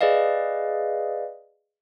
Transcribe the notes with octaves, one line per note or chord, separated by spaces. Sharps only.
G#4 B4 D5 D#5 F5